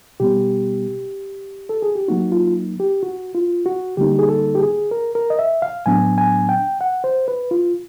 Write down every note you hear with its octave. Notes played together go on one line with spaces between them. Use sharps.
B2 G3 B3 G4
A4
G#4
G4
F#3 A#3 D#4 F#4
F4
G4
F#4
F4
F#4
D3 G3 A#3 D#4 G4
G#4
A4
G4
G#4
A#4
A#4
D#5
E5
F5
A2 F#3 B3 D4 G#5
G#5
G5
F#5
C5
B4
F4